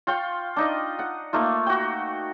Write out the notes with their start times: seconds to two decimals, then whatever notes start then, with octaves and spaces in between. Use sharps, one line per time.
0.07 F4 F5 G5 C#6
0.56 D4 D#4 D#5
0.99 F#5
1.33 A3 A#3 D#4 F4
1.66 F#4 G5